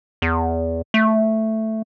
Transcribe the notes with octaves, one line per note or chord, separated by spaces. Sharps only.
E2
A3